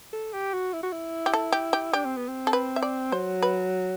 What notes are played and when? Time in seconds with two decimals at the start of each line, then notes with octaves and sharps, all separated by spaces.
0.13 A4
0.33 G4
0.53 F#4
0.73 E4
0.83 F#4
0.92 E4
1.26 G4
1.33 A4
1.52 G4
1.73 G4
1.93 D4 G4
2.05 C4
2.17 B3
2.28 C4
2.47 A4
2.53 B4
2.76 E5
2.82 D5
3.12 F#3 C5
3.42 B4